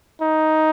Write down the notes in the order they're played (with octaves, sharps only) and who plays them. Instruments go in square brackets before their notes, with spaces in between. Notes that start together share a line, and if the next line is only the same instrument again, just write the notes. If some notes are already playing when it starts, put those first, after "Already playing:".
[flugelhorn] D#4